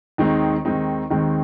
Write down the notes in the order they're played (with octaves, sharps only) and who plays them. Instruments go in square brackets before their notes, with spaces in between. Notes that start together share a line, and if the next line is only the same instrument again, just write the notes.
[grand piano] D#2 D#3 G#3 C4 D#4
D#2 D#3 G#3 C4 D#4
D#2 D#3 G#3 C4 D#4